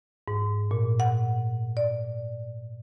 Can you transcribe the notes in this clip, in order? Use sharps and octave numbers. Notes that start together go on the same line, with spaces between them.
G#2
A#2
F#5
D5